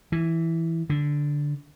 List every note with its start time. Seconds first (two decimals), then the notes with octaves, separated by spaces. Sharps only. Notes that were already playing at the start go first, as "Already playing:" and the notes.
0.12 E3
0.90 D3